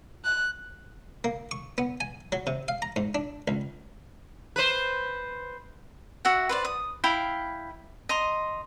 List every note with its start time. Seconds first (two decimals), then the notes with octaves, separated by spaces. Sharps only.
0.24 F#6
1.24 A#3
1.51 C#6
1.78 B3
2.00 G#5
2.32 F#3
2.47 C3
2.68 F5
2.82 A#5
2.96 G#2
3.15 D4
3.48 C#2
4.56 B4 C5
6.25 F#4 E5 F#5
6.49 B4 C5 D5
6.65 D#6
7.04 E4 F5 G5 B5
8.09 D#5 A#5 C6